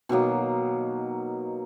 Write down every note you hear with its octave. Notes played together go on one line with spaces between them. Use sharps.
B2 D#3 F#3 A#3